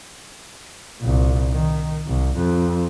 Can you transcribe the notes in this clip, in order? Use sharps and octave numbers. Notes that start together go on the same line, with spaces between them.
C2 A#2
D#3
C2
F2